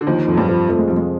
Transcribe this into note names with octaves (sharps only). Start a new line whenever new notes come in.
D3
D#2 D#3 F3
F2
F#3
G2 G3
F3
F2 A3
G#3
F2 G3
G#3